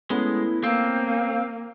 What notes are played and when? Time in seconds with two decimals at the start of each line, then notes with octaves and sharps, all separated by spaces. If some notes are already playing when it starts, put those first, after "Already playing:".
0.10 G#3 A3 B3 C#4 E4
0.63 A#3 C4 F5